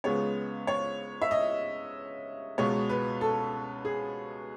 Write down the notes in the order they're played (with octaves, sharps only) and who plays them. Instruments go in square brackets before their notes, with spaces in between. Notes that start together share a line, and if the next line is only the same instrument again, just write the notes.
[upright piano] C#2 C#3 G#3 B3 C#5
C#5
E5
D#5
C#2 B2 G#3 B3 C#5
B4
A4
G#4